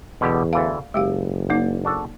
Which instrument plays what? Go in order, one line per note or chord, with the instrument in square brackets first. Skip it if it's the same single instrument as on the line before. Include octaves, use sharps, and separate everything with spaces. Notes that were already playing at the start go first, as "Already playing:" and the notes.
[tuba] E2 [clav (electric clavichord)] B2 D3 G4
[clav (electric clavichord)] D2 E3 A4 [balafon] F5
[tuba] F#1 [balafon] G#3 G4 F5 [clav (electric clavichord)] G5
[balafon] A#3 D#4 [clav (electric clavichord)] D5
[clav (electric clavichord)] D4 F#4 A4